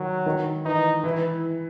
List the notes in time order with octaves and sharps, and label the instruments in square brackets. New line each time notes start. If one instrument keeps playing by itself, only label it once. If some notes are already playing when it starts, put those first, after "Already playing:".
Already playing: [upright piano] D#3 [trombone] F#3
[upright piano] D#3
[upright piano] E3 [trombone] D#4
[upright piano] E3 [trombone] E4